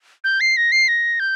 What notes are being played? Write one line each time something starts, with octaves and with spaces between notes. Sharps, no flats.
G6
C7
A#6
C7
A#6
G6